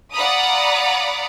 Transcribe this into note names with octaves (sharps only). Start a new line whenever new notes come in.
D5 F5 F#5 A#5 B5 D#6